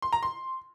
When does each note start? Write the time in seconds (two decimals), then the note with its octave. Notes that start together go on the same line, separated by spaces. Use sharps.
0.02 C6
0.13 A#5
0.23 C6